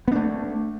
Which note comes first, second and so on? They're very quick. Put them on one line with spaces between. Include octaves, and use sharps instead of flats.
B3 D4 A3